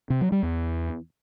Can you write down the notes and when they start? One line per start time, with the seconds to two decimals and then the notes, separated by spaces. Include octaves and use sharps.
0.10 C3
0.21 F#3
0.32 G3
0.43 E2